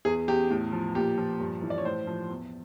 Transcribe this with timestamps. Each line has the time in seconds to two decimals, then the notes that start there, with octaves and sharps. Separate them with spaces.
0.05 E2 G#4
0.28 E2 G4
0.50 A2
0.72 F3
0.95 A#2 G4
1.18 F3
1.40 G2
1.62 E3
1.70 D5
1.78 C#5
1.85 A2 C5
2.07 F3
2.29 E2